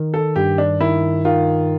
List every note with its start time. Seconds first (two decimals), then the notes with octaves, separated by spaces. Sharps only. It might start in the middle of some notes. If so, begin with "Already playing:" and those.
Already playing: D#3
0.14 A4
0.36 G2 G4
0.58 D4
0.81 D#3 E4
1.25 D#3 F4